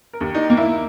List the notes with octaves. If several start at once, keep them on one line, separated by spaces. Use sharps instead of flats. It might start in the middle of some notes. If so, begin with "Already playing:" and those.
A#4
D#2
D#4
A#3
E4